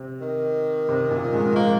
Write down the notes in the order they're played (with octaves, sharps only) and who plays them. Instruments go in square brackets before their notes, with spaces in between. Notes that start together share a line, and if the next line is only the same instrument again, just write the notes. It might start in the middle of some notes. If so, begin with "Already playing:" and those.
Already playing: [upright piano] C3 C4
[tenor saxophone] D#3
[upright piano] C3 C4
A#2 A#3
G#2 G#3
[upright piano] F3 [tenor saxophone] A#3